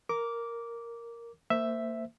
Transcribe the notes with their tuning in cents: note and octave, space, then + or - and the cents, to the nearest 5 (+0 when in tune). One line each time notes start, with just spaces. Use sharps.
A#4 +0 D6 -15
A#3 -30 C5 -15 E5 +0